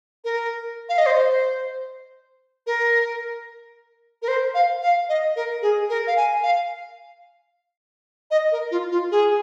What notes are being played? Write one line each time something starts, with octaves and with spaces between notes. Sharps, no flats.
A#4
F5
D#5
C5
A#4
A#4
C5
F5
F5
D#5
A#4
G#4
A#4
F5
G#5
F5
D#5
A#4
F4
F4
G#4